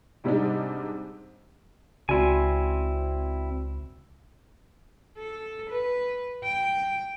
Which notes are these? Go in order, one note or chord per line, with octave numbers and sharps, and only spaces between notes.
G#2 C3 G3 G#3 D4 D#4
C#2 C4 E4 F#4 D5 G#5 C6
A4
B4
G5